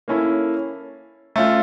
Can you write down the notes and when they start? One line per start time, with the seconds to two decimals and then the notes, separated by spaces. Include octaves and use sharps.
0.08 A#3 C#4 E4 A4
1.36 A3 C#4 F4